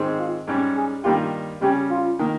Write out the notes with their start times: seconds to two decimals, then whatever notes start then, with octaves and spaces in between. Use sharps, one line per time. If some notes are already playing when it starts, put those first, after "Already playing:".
Already playing: G#2 D#3 G#3 C4
0.19 F4
0.47 G#2 G3 C#4
0.76 G#4
1.04 G2 D#3 G3 A#3 F4 G4
1.61 C#3 G3 C#4 G4
1.90 F4
2.19 D#3 A#3